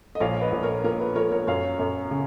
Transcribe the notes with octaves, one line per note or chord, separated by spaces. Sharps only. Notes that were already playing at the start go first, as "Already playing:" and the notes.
D#5
A#1 C#5 F5
B4 D#5
A#1
A#4 C#5
A#2 A#4
B4
F3 A#4 C#5
A#4 C#5
F#2 C#5 F5
F#2
C#3